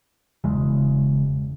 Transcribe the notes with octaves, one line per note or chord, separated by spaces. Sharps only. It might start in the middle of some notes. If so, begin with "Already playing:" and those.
E1 E2 C#3 G#3